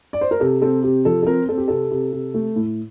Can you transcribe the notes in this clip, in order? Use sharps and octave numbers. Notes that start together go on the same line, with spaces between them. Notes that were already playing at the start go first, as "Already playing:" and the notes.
D5
C5
A#4
C3 A4
C4 A4
C3 G4
F3 A4
A4
C4 A#4
C4 A4
G4
C3 A4
C3
C3
A3
A2